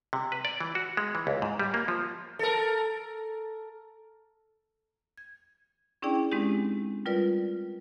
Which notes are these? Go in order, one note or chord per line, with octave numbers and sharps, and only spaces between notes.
C3
B4
D5
E3
F#4
G#3
E3
C#2
G#2
G3
A#3
F3
A4 A#4
G#6
C#4 D4 E4 G#4 D5 G5
G#3 C4 C#4 D#4 G4
G3 F4 A#4 B4 D5